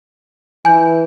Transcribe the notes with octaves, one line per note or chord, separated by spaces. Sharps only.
E3 G#5 G6